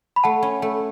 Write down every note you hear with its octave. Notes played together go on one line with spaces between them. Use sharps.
B5
A3 F#5 A5
C#4
A3